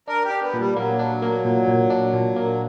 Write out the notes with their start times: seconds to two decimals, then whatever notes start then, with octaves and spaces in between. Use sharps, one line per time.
0.08 D4 A#4
0.24 G4
0.30 D4
0.42 B3
0.54 A#2
0.59 G3
0.76 F#3 A#3
0.99 D4
1.22 A#3
1.45 A#2
1.68 A#2
1.90 D4
2.14 A#2
2.36 A#3